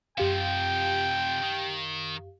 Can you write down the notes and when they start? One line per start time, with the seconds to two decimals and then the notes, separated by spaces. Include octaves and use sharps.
0.18 F#2 C3 F3 G4 F5 G5
1.42 D#3